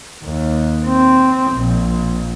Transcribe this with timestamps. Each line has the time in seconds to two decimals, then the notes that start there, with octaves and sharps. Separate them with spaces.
0.24 D#2
0.86 C4
1.53 A#1